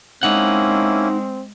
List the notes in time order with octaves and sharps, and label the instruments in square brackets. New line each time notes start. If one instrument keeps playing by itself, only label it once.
[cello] G#3 [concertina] A#3 C#4 E4 [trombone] C4 [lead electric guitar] D#4 F#5